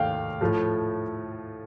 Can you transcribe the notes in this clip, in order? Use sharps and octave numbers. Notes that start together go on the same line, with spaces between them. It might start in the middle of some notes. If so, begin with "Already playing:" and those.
Already playing: D#2 D#3 A3 F5 G5
A2 F3 A3